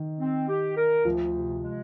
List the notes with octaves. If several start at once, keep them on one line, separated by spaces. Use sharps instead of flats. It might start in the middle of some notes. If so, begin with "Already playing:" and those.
Already playing: D#3
C4
G4
A#4
D2 F3
C3
G#3